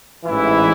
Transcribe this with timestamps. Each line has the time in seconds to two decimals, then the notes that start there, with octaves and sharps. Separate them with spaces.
0.25 A1 G#2 E3 E4